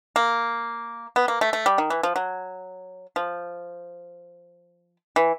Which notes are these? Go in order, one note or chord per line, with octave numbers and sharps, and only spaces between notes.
A#3
B3
A#3
A3
A3
G3
D#3
E3
F3
F#3
F3
E3